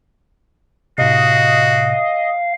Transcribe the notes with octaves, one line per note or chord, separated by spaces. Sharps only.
A2 C3 F#4 D#5 F5